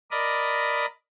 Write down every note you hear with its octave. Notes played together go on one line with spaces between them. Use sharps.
A#4 D5 D#5 B5